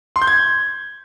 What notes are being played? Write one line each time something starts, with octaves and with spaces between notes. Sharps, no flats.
C6
G6
G#6